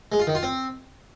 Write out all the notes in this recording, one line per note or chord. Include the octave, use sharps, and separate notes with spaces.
G#3
F4
D#3
F4
C4